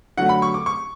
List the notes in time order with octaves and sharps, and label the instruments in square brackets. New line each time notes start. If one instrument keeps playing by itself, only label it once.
[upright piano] D3 F#3 A3 F#5
B5
C#6
D6
C#6